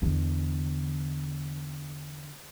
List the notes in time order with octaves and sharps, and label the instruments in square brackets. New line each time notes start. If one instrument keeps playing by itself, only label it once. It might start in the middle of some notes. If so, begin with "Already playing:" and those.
[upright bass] E2 D3